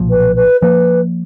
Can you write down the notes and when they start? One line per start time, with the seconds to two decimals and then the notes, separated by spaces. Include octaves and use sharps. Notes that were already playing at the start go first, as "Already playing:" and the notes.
Already playing: B1 A#2 F3
0.10 B4
0.36 B4
0.61 F3 A#3 B4